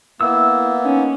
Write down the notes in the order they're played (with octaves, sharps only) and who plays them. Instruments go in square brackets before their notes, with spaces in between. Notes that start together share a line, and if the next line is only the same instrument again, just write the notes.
[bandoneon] A#3 B3 [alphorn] E4 [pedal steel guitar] E6
[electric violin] C#4 [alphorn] D#4